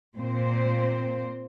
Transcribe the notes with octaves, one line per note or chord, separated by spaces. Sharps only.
A#2 C4 C5